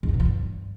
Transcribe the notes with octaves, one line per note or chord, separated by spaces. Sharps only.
G#2
G2
B2
F3
G2